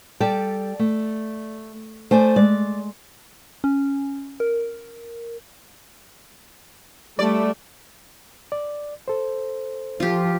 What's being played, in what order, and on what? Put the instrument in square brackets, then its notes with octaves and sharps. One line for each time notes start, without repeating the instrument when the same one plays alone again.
[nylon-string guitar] G3 G4 A4 [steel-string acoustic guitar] D5
[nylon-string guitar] A3
[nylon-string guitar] A3 [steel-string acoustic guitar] C5 D5 G#5
[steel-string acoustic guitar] G#3 [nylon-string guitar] D5
[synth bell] C#4
A#4
[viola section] G3 A3 [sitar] D5
[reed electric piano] D5
A4 C5
[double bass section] F3 [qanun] F4 G4